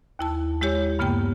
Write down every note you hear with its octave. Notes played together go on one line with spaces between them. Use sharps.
D#2 E4 A5
G#3 E4 G4 C#5
G2 C#3 A#3 B3 G4 G5